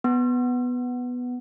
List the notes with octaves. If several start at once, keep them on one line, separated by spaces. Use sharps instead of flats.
B3